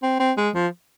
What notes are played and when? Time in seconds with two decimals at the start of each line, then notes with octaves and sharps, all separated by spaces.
0.03 C4
0.20 C4
0.37 G#3
0.55 F3